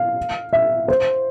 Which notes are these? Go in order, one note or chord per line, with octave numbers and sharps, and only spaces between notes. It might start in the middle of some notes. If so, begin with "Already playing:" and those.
Already playing: F5
E5
C5